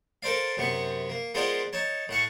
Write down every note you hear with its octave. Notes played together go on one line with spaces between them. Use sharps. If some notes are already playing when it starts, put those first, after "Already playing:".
A4 A#4 C5 D5 F5
F#2 C3 B3 C#6
A#3
G#3 B3 F4 A#4 C5 D5
D#4 C#5 A5
A2 F#5 A5 C#6